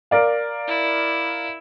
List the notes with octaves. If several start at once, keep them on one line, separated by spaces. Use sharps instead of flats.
A#4 D5 F5
E4